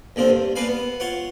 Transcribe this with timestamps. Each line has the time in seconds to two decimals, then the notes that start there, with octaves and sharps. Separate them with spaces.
0.16 D#2 D3 A#3 C4
0.29 G2
0.56 A#3 D4 B4 F5 G#5
0.69 B3
1.00 F4 C#5 F#5